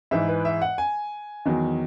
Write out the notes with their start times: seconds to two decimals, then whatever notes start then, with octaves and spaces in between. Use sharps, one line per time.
0.11 G#2 E3 E5
0.28 B4
0.45 E5
0.61 F#5
0.78 G#5
1.45 E2 D#3 F#3